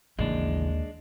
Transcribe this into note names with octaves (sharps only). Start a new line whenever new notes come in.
A1 D#2 C#3 E3 G#3 D4